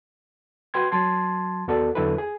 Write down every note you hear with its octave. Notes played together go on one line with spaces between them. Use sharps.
F#4 B4 G5 C6 G#6
F#3 A5 C6 G#6
D#2 B3 F#4 A4 D5
E2 D3 F#3 E4 A4 B4
G#4